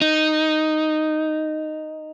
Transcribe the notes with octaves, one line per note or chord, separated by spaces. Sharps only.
D#4